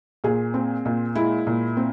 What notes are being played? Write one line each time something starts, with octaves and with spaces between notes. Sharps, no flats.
A#2 G#4
C4
A#2
G#3 E4
A#2
C4